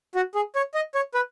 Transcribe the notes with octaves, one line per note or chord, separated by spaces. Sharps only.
F#4
G#4
C#5
D#5
C#5
B4